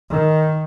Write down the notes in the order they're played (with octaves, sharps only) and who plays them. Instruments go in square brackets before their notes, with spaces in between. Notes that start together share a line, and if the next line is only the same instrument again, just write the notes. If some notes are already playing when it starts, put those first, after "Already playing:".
[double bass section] D#3